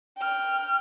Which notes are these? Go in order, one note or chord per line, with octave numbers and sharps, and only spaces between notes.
G5 F6